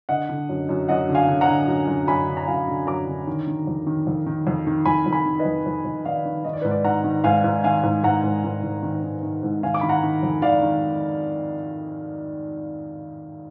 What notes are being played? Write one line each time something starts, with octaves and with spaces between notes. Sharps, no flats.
D3 D#5 F#5
D3
F#2
F#2
F#2 D#5 F#5
D3
F5 G#5
D3
F#5 A#5
D3
F#2
F#2
F#2 G#5 B5
D3
A#5
F#2 F5 G#5
D3
F#2 A#5 D6
D3
D#3
D#3
F2
D#3
F2
D#3
F2
D#3
F2 G#5 B5
F2
G#5 B5
D#3
B4 D#5
F2
F2
F2
D#3 D5 F5
D#3
D#3 D#5
D5
G#2 B4
D5
D#3 F#5 A#5
D#3
G#2 F5 G#5
G#2
D#3 F5 G#5
G#2
G#2 F#5 A#5
G#2
G#2
G#2
D#3
D#3
D#3
G#2
D#3 F5 G#5
D6
D#3 B5
F#5 A#5
D#3
F2
D#3 D5 F5
D#3